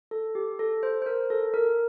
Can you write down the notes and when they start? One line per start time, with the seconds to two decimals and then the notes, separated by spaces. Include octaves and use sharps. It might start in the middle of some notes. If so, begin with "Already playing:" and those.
0.11 A4
0.35 G4
0.59 A4
0.83 C5
1.02 C5
1.06 A#4
1.30 A4
1.54 A#4